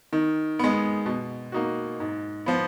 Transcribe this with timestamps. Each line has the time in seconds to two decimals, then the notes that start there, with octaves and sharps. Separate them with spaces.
0.13 D#3
0.59 G#3 B3
1.06 B2
1.52 A#3 D#4 F#4
2.00 G#2
2.46 F3 B3